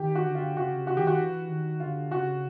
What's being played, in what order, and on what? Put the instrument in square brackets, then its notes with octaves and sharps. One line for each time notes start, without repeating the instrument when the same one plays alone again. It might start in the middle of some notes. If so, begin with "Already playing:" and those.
Already playing: [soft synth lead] D#3 [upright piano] G4
[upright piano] F#4
[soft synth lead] D3
[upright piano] F4
[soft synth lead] C#3 [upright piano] F#4
[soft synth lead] C#3
[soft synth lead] C#3 [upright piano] F#4
[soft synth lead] E3 [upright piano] G4
[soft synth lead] D#3 [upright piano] F#4
[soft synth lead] E3
D#3
[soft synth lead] D3 [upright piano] F4
[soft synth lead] C#3 [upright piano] F#4